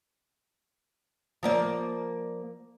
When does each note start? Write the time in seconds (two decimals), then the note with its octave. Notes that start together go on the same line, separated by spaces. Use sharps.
1.43 F3 A#3 D5